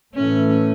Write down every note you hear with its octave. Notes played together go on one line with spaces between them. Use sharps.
A2 E3 A3 C#4